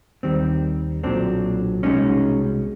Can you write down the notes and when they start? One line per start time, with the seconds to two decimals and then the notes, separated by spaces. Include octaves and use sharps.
0.23 D#2 D#3 G3 C4
1.03 B1 A#2 F#3 C4 D4
1.83 C2 B2 G#3 C#4 D#4